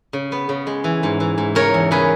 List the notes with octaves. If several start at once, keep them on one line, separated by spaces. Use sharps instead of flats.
C#3
B3
C#3
G#3
E3
G#2
E3
G#2
C#3 A#4 C#5
E2
C#3 G#4 B4